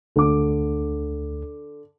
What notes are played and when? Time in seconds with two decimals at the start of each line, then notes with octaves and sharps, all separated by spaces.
0.16 D2 D3 D6